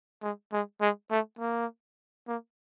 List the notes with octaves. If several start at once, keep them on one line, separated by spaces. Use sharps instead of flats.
G#3
G#3
G#3
A3
A#3
A#3